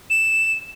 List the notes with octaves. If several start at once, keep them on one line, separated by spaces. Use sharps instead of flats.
E7